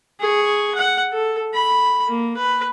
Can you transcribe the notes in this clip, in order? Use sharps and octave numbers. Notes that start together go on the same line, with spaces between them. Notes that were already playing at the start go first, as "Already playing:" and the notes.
G#4 C#6
F#5
A4
B5
A#3
B4